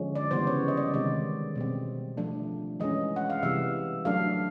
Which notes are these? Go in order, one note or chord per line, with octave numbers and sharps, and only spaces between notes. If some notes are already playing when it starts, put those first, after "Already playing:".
Already playing: D3 F3 G#3 C#4
D5
C#3 E3 G3 B3 C5
C#5
D#5
D5
C3 D#3 G#3 D5
B2 G3 C4
F3 A3 D4
E3 G#3 C#4 D#5
F#5
F5
C3 E3 G3 E5
F#3 A3 D4 F5